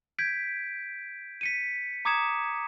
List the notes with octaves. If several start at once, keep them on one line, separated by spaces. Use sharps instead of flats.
G6 G#6 B6 D7
B6 C#7 D#7
A#5 D6 D#6 G#6 C#7 E7